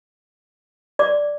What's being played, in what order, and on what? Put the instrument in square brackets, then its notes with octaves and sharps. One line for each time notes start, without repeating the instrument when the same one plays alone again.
[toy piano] D5 D6